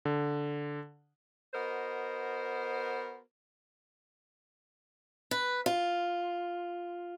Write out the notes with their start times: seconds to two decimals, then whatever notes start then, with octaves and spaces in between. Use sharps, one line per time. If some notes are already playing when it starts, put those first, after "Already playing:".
0.05 D3
1.54 B3 F#4 A#4 C5 D#5
5.31 B4
5.66 F4